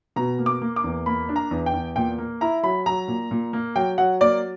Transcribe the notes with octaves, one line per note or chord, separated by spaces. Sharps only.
B2 A#5
A#3
D6
A#3
D6
E2
A#3 B5
D4
A#5
E2
G5
E2
A#2 G5
A#3
E4 A#5
F#3 B5
F#3 A#5
A#2
A#2
A#3
F#3 G5
F#3 F#5
A#3 D5